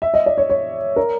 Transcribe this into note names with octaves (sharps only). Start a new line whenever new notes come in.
E5
D#5
D5
C#5
C#5
A#4